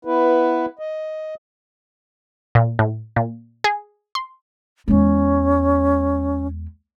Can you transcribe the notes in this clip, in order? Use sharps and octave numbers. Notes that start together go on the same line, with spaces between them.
B3 E4 B4
D#5
A#2
A2
A#2
G#4
C6
E2 G#3 C#4